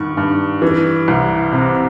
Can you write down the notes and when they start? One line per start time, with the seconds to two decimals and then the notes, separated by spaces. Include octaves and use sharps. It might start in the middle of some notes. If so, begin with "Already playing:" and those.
Already playing: G2 D#3 C#6
0.17 G2
0.62 E3
1.08 C2
1.52 C3